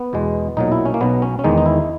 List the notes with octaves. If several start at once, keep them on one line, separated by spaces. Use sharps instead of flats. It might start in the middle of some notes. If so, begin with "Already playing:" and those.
Already playing: B3
E2 B2 G#3
B1 A#2 F#3 D#4
E4
C#4
A#3
B1 B2 F#3 B3
C#4
C#4
E2 D#3 G#3 D#4
D#4
E4